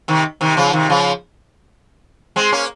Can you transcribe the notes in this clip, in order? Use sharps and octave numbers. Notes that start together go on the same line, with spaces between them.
C3 D#3
C3 D#3
C#3 F3
C3 D#3
C#3 F3
G#3 C4
A#3 C#4